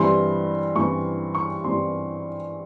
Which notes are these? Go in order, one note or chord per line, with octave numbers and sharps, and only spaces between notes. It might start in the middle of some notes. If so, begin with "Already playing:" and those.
Already playing: G2 E3 G3 C4 C6
G2 E3 G3 C4 C#6
C#6
G2 E3 G3 C4 C6